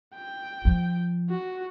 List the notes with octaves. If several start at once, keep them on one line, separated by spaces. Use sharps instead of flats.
G5
F3
F#4